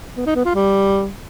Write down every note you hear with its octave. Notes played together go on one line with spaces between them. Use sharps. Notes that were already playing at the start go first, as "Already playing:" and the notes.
B3
D#4
B3
F4
G3